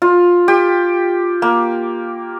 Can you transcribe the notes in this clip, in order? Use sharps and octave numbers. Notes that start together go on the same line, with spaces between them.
F4
G4
A#3